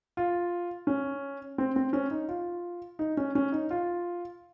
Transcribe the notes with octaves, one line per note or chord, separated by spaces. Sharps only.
F4
C#4
C4
C4
C#4
D#4
F4
D#4
C#4
C#4
D#4
F4